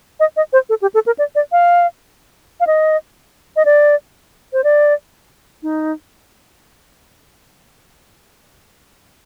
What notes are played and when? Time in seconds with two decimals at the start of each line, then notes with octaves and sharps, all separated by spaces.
0.20 D#5
0.37 D#5
0.53 C5
0.69 A4
0.82 G4
0.94 A4
1.06 A#4
1.18 D5
1.35 D5
1.52 F5
2.60 F5
2.67 D#5
3.56 D#5
3.65 D5
4.53 C5
4.64 D5
5.63 D#4